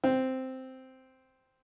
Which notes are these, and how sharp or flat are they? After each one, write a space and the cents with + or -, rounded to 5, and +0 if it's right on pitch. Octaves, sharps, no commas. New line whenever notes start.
C4 -5